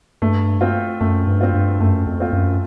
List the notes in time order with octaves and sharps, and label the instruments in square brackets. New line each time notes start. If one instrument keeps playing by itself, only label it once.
[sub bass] G2 [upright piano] A3
[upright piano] C4 F4
[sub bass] F#2 [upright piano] A3
[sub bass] G2
[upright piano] C4 F4
[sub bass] G2
[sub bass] F#2 [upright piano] A3
[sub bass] F2
[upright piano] C4 F4
[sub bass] F#2